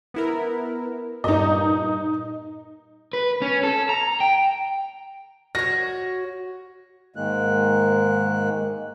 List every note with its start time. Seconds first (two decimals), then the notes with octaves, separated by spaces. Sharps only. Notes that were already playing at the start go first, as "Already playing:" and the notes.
0.14 B3 E4 A#4
1.24 G2 A#2 D#4 D#5
3.13 B4
3.42 C#4
3.63 A4
3.89 A#5
4.20 G5
5.55 F#4 C#5 A#6
7.16 G#2 D#3 G#3 A#3 F#6